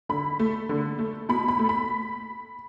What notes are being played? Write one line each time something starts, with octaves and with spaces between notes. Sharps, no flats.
D3 B5
A3
D3
A3
B2 B5
B5
A3
B5